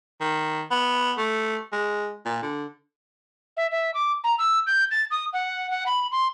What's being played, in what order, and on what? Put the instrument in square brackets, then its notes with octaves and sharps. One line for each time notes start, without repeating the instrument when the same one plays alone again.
[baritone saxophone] D#3
B3
A3
G#3
A#2
D3
[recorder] E5
E5
D6
A#5
E6
G6
A6
D#6
F#5
F#5
B5
C6